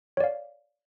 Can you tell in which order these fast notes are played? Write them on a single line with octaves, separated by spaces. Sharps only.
C#5 D5 F5